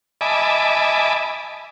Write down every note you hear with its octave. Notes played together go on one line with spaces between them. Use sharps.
D#5 E5 G#5 A5 B5 D6